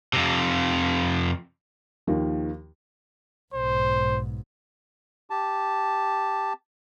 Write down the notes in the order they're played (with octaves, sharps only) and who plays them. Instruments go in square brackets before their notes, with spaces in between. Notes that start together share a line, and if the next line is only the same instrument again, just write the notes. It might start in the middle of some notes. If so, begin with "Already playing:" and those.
[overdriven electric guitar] F2 C3
[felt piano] D#2 D#3 F3
[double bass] B1 G#2 [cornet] C5
[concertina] G4 A5